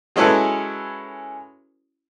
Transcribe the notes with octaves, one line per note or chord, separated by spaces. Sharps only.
F#3 G#3 C#4 E4 A4 B4